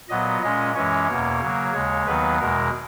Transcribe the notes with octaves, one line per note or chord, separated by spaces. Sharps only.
A#2 F#3 B3 D#5
A#2 G#3 C#4 D#5
F#2 E3 G#3 C#4 C#5
E2 B2 A#3
C#3 F#3 A#3
D#2 C#3 G#3 C#5
D#2 D#3 F#3 B3 B4
E2 B2 G#3 A#4